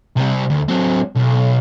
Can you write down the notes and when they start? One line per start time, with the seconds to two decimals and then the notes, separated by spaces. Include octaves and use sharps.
0.17 C3 G3
0.50 D2
0.68 F#3 C4
1.15 B1